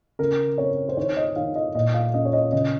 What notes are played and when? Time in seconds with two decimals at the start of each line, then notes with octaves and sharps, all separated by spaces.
0.19 C#3 A#4
0.58 C4 C#5
0.89 C5
0.97 D#3 C#5
1.17 D#5
1.36 D#3 F5
1.56 D#5
1.75 A#2 D#5
1.94 F5
2.14 C#4 D#5
2.25 C#5
2.33 D#5
2.52 C#3 D#5